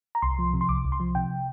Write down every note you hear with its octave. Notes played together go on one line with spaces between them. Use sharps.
A#5
C2 C6
F3
C3
C6
C2 D6
C2
C6
F3
C3 G5